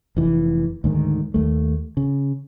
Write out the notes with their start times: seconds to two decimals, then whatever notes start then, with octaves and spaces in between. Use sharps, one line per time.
0.17 F1 E3
0.84 D2 G#2 D#3
1.34 D#2 A3
1.97 C#3